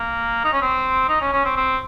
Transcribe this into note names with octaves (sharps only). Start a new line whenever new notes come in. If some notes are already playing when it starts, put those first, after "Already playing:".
Already playing: A#3
D#4
C#4
C4
D#4
C#4
C#4
C4
C4